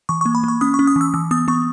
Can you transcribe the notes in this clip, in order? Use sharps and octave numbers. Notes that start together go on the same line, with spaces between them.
E3 C#6
C#6
A#3
B5
A#3 C#6
C#4 D#6
C#6
C#4
D#6
E3 E6
E3 E6
B3 D#6
B3 C#6